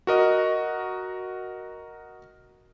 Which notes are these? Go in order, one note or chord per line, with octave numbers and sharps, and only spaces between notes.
F#4 A#4 D#5